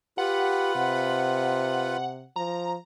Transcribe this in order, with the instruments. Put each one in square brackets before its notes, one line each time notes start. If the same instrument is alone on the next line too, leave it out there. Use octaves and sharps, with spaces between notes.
[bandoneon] F4 B4 B5 [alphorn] G4 [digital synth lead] F#5
[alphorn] C3
[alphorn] F3 [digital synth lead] A#5